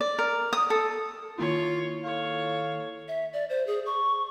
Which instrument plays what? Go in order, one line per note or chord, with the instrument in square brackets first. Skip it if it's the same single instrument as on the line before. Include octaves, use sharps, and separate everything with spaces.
[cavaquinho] D5
A#4
D#6
A4
[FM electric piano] D#3 A#3 E4 [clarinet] F4 [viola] C#5
[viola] A4 C#5 [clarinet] F5
[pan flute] E5
D5
C5
G#4
C#6